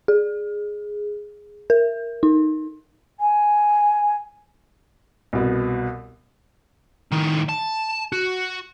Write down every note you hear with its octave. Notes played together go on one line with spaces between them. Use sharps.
G#4
A#4
D#4
G#5
C2 B2
A2 D#3
A5
F#4